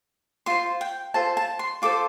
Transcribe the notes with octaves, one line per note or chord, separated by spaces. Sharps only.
F4 C5 C6
G5
F4 A4 C5 A5
A5
C6
F4 A4 C5 D6